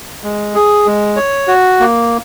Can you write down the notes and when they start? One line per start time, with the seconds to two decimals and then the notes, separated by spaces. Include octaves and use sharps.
0.24 G#3
0.55 G#4
0.86 G#3
1.16 C#5
1.48 F#4
1.80 A#3